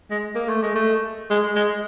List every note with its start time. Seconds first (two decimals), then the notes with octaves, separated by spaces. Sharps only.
0.11 G#3
0.36 A#3
0.49 A3
0.63 G#3
0.75 A3
1.30 G#3
1.56 G#3